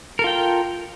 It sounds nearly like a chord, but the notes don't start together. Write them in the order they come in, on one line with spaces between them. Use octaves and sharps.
A#4 A4 F4 G5